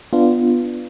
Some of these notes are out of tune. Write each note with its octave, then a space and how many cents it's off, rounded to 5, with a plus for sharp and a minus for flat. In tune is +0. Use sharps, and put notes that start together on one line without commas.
B3 +0 D4 +5 F4 -15